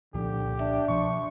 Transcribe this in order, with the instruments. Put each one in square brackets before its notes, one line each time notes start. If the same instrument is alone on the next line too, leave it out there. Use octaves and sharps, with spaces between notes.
[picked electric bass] C2 A#2 F3 [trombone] D3 [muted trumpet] G4
[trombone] D4 [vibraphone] E5
[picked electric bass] B2 F3 [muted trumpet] C#6